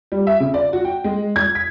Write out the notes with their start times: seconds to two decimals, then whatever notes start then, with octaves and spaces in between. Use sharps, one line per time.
0.12 G3
0.27 E5
0.40 C#3
0.54 D5
0.73 F#4
0.85 G5
1.04 G#3
1.36 G#6
1.55 B6